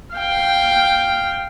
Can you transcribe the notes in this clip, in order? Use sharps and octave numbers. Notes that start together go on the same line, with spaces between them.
F5 G5